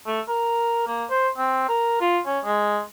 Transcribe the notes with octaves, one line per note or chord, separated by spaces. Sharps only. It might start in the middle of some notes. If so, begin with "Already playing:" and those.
A3
A#4
A#3
C5
C4
A#4
F4
C#4
G#3